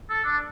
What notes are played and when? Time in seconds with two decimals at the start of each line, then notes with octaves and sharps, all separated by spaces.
0.10 A4
0.24 D4